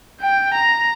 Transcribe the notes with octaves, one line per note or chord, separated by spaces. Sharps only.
G5
A#5